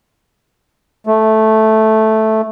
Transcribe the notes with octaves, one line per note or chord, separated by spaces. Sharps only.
A3